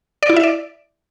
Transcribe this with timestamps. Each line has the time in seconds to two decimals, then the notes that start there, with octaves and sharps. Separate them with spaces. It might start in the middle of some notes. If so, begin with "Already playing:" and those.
0.23 D5
0.29 E4
0.36 E5
0.43 D5